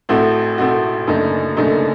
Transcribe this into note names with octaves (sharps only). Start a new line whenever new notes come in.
A1 A2 A3 C4 F#4
A1 A2 A3 C4 F#4
F#1 F#2 D3 A3 D#4
F#1 F#2 D3 A3 D#4